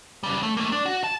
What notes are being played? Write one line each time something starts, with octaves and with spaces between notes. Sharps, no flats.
C#3 G3
A3
A3 A#3
D4
F#4
A5